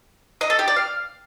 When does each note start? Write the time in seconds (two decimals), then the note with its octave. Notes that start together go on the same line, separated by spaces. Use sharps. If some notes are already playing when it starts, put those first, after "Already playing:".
0.41 D#5
0.50 A4
0.59 G4
0.68 D5
0.76 F5